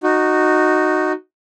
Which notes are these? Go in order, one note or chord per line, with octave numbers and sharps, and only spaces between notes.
D#4 F#4